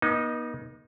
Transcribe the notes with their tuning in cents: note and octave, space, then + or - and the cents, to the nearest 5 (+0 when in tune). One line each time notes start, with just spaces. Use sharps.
B3 -45 D#4 +0